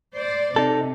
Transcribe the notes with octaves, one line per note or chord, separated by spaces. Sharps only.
C5 D5
C3 D#4 A4